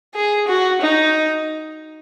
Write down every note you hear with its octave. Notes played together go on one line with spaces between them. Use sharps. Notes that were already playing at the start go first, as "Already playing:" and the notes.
G#4
F#4
D#4